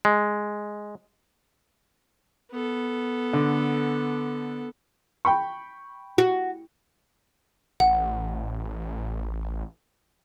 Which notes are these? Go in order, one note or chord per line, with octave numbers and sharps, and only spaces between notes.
G#3
B3 A4
D3
G5 B5 C#6
F#4
A1 F#5